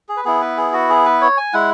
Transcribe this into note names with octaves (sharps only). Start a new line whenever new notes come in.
G#4
B4
B3 E4 G#4
B4
G#4
F#4
G#4
B4
C#5
G#5
G#3 E4 F#5